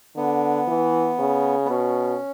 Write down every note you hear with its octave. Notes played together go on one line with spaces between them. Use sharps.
D3 B3
E3
C#3
B3
B2 C#4